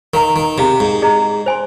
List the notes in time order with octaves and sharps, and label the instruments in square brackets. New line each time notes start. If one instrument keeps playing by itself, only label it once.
[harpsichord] D#3 [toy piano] A#4 F5 A#5
[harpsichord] D#3
[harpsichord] C3 [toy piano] G#4 F5 A#5
[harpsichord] G#2
[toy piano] G#4 D#5 A#5
C5 G#5 C6